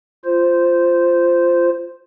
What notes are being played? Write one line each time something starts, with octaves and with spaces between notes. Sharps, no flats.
F4 C5